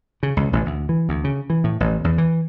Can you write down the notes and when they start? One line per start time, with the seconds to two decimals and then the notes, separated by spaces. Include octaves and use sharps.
0.23 C#3
0.37 C#2
0.53 A1
0.66 D2
0.89 E3
1.09 D2
1.24 C#3
1.50 E3
1.64 A2
1.80 A1
2.04 E2
2.18 E3